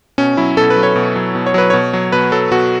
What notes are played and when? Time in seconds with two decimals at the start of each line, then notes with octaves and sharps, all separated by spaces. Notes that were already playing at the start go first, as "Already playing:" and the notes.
0.18 B2 C#4
0.37 F#3 E4
0.57 B2 A4
0.70 B4
0.76 F#3
0.83 C#5
0.96 B2
1.16 F#3
1.35 B2
1.46 C#5
1.54 F#3 B4
1.70 B2 C#5
1.93 F#3
2.12 B2 B4
2.32 F#3 A4
2.51 B2 F#4